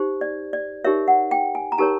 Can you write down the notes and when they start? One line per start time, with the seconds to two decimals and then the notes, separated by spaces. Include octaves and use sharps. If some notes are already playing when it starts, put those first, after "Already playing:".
Already playing: D#4 G4 C5
0.21 D5
0.53 D5
0.85 D#4 G4 A#4 C#5 E5
1.08 F#5
1.31 G5
1.55 G#5
1.72 A#5
1.78 D#4 G4 A#4 C#5 A5